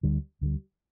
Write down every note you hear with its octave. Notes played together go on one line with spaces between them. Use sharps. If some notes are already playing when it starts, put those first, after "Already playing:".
D2 D3 G3
D2 D3 G3